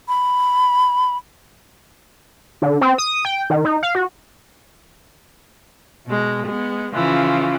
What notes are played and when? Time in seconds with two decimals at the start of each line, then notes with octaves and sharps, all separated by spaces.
0.08 B5
2.62 D3
2.81 C4
2.98 D#6
3.25 G5
3.50 D#3
3.65 D#4
3.83 F5
3.95 F#4
6.07 B2 G#3
6.46 G#3 B3
6.95 C#3 E3 F3 F4